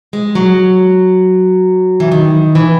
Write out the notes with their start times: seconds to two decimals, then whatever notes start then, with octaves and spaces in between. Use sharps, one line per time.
0.13 G#3
0.35 F#3
2.00 E3
2.12 D#3
2.55 E3